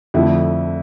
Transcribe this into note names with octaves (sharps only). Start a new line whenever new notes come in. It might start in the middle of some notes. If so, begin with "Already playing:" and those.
F2 D3 F3 A3 E4